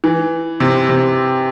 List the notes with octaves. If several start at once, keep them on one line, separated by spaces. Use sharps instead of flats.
E3
C3
C3